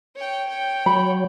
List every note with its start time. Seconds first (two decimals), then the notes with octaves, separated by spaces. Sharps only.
0.15 C#5 G5
0.47 C#5 G5
0.86 F#3 B5